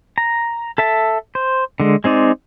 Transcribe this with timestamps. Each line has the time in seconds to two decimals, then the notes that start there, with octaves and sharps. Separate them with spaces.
0.18 A#5
0.78 A4 E5 A5
1.35 C5
1.80 D3 G#3
2.04 G#3 C4 D#4 D5